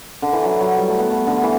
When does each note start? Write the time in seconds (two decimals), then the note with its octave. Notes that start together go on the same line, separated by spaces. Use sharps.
0.22 D3
0.33 E3
0.44 F#3
0.60 F#3
0.77 G3
0.89 A3
0.98 B3
1.10 A3
1.27 D3
1.43 E3